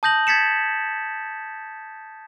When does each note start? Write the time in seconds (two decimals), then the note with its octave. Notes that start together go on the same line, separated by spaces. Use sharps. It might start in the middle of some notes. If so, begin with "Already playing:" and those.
0.03 A5 D#6 G6 A#6 F#7
0.27 G#6 A6 B6 C#7 E7